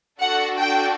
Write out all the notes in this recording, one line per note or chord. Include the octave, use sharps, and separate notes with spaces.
D4 F#4 A4 F#5
G5